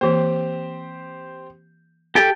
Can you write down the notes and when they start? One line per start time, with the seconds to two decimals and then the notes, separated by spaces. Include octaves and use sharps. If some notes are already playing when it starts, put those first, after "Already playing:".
0.01 E3 A#3 C4 G4 C5
2.15 G4 A4 G5